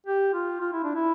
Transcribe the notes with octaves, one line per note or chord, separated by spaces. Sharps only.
G4
F4
F4
E4
D4
E4